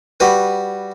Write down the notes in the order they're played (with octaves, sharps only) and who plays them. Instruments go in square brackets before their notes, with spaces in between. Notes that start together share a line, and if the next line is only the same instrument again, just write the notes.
[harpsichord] G3 F#4 B4